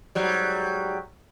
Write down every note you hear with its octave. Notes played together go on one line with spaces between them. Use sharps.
G#2 F#3 G3